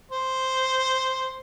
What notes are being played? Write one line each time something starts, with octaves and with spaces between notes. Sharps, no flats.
C5